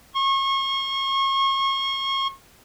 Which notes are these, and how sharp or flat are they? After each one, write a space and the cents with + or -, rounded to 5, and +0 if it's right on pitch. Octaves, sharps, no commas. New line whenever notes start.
C#6 -35